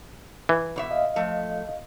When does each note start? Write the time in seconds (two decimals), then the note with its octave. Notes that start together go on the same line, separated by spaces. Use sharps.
0.49 E3
0.76 B2 C#5 E5
0.91 D#5 F5
1.16 F3 A3